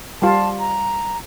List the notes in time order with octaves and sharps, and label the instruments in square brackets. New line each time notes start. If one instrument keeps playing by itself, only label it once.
[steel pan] G3 F4 [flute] A5
[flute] A#5